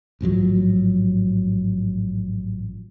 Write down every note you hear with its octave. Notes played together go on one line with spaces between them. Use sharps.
A1 G#2 F3 F#3